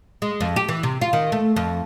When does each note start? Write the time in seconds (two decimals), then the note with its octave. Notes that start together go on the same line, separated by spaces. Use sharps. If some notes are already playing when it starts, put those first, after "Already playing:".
0.22 G#3
0.41 F2
0.56 G4
0.69 E3
0.83 C3
1.01 F4
1.13 D#3
1.32 A3
1.56 F2